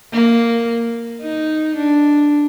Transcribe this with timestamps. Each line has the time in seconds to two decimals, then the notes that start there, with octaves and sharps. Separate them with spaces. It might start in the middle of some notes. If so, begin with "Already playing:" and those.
0.13 A#3
1.21 D#4
1.76 D4